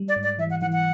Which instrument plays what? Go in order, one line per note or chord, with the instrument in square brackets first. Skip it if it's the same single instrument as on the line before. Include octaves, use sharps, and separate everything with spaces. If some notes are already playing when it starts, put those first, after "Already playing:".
Already playing: [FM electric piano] G3
[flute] D5
[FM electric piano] G#2
[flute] D5
[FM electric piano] E3 [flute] E5
[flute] F#5
[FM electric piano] E3 [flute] F#5
[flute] F#5